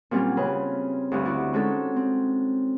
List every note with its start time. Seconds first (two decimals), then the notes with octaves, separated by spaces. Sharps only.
0.11 A#2 F#3 G3 C4 C#4 F4
0.37 C#3 C4 B4
1.12 D2 G2
1.25 E4 F#4 D5
1.53 G#3 C4 C#4 D#4 A4
1.96 C4